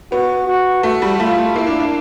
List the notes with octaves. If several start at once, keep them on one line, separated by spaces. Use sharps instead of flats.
B3 F#4
F#4
A3 F#4
G3
A3 F4
A3
A#3 E4
D4
D4